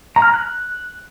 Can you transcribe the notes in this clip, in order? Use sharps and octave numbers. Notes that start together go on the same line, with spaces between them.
A#5
F6
A#5
F#6